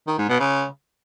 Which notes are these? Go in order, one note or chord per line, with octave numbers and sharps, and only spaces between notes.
D#3
G#2
B2
C#3